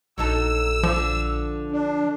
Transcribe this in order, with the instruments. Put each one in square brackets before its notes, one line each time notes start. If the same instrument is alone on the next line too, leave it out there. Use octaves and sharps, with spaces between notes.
[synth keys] A#1 [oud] F#3 D#4 A4 [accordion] E6
[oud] D3 [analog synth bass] F3
[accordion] D4